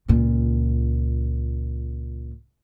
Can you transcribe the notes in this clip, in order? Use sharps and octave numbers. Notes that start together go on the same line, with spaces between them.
C#2 A#2